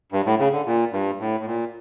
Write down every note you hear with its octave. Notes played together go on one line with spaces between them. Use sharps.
G2
A2
C#3
D3
A#2
G2
A2
A2
A#2